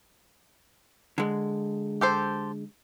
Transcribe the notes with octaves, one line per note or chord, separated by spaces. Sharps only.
D3 G#3
G4 A4 C5